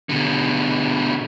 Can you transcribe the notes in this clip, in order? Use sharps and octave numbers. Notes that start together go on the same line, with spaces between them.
B2 D3